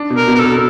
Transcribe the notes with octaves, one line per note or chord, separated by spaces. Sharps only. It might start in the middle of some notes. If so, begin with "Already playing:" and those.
Already playing: D4
B2
A#4
B2
A#4
A4
B2